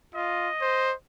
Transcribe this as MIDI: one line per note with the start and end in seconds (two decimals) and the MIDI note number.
0.14 0.49 65
0.14 0.93 75
0.61 0.93 72